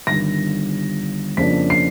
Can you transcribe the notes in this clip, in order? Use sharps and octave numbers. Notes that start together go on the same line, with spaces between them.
G1 G2 D#3 A#6
F2 C#3 F3 A#3 D4 B6
C7